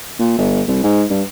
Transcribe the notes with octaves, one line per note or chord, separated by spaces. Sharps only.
A#2
G1
C2
G#2
G2